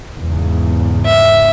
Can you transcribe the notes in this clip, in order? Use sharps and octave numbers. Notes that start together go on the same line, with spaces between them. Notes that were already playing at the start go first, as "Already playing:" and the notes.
E2 G#2 C#3
E5